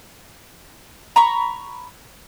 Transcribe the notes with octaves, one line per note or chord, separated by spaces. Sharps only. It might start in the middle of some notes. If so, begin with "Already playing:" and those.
A#5 B5 C#6